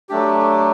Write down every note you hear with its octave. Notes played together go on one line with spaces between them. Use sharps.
F#3 A3 D4 G4